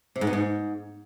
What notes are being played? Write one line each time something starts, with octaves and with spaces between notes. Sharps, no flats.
C3
G#2
B2
G#2